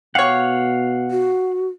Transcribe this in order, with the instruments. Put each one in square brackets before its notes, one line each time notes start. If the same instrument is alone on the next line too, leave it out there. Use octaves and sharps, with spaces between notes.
[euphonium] B2 [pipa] G4 C#5 [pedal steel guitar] F5 F#5
[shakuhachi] F#4